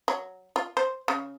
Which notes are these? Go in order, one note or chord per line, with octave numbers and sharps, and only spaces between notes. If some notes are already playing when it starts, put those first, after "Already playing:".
F#3
F4
C5
C#3